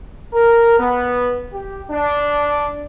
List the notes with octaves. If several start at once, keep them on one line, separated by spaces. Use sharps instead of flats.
A#4
B3
G4
D4